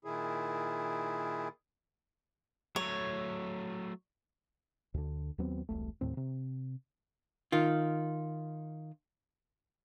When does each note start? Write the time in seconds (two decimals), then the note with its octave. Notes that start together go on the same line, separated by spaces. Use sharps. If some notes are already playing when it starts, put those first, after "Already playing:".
0.05 A#2 D#3 E4 G#4
2.76 F#3 A3 C#5
4.94 D2 D3
5.38 D#2 F#3 B3 C4
5.69 E1 C2 A3
6.01 D#2 A2 C4
6.17 C3
7.52 D#3 F4